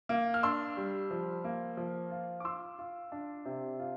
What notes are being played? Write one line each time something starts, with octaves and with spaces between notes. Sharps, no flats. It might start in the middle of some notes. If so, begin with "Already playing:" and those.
A#3
F6
D4 C6 E6
G3
F3
A#3
F3
F4
D6
F4 C6 E6
F4
D4
C3
F4